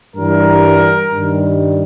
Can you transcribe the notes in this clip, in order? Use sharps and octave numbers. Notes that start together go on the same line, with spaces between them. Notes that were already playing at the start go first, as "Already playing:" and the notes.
G2 E3 G3 A#4
G2 D#3 G3